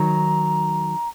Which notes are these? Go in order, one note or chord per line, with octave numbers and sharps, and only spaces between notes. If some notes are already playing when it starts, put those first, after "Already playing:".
Already playing: D#3 F#3 A#5